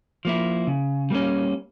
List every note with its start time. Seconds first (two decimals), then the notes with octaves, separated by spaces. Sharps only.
0.25 F3 A#3 E4
0.67 C#3
1.10 G3 A#3 C#4